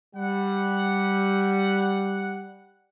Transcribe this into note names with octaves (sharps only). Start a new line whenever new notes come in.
G3 F#5